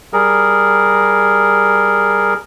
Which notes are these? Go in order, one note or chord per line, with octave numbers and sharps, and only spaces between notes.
G3 G#4 A#4